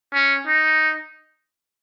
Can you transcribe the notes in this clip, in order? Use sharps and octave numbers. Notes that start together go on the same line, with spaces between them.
C#4
D#4